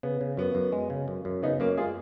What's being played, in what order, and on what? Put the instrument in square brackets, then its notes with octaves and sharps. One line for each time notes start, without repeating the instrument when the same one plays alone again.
[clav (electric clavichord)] C#3 [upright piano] B3
[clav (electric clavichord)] C#3
[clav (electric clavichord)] F#2 [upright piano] B3
[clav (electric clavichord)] F#2
G#3
C#3
F#2
F#2
[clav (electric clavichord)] C#3 [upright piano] B3 D#4
[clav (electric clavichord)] F#2 [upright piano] A#3 C#4
[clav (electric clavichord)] G#3 [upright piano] F4 G#4